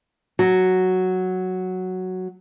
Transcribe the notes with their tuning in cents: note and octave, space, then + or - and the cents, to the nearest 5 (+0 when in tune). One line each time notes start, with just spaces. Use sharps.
F#3 +0 F#4 +0